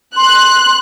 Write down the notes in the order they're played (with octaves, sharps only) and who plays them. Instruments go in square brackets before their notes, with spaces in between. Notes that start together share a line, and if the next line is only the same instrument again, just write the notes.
[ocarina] C6 [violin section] F#6